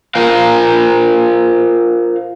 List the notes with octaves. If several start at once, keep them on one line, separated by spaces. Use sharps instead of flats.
F4 A#4 C5 F5